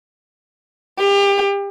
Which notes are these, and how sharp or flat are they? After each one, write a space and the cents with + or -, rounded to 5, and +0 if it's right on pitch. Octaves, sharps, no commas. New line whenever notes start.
G4 +30